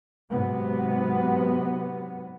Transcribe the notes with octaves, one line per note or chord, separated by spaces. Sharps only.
G#2 C3 F#3 B3